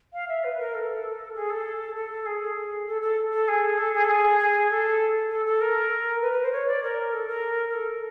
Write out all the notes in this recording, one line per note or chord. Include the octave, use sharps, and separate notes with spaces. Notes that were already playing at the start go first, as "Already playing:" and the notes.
F5
E5
B4
A#4
A4
G#4
A4
A4
G#4
A4
A4
A4
G#4
A4
G#4
A4
G#4
G#4
A4
A4
A4
A#4
B4
B4
C5
C#5
D5
A#4
A4
A#4
A#4
A4